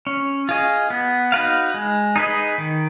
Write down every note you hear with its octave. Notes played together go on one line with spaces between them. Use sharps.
C#4
F4 G#4 D#5
B3
D#4 F#4 B4 F5
G#3
D#4 G#4 B4 D#5
D#3